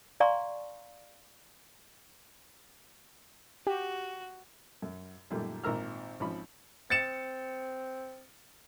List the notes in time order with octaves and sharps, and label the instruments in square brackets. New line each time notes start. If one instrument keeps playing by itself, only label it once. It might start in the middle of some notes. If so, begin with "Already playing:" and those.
[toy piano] D5 F5 G#5 A#5 C6 C#6
[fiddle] F#4 [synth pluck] G4
[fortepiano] F#2
F#2 A#2 D#3 G3 A3
G#1 A#2 A#4 A#5 E6 F6
G#1 F3 C#4 B5
[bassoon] C4 [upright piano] A6 C#7 E7